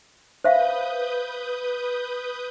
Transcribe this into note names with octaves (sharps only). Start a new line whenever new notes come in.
B4 C5 E5 F5 D#6 G6